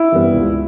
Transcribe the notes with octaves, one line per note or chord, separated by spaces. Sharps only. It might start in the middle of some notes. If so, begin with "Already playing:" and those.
Already playing: E4
G2 E3 G3 B3
C#2